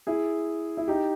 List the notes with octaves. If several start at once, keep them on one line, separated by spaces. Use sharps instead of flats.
E4 G#4
E4
D#4 G4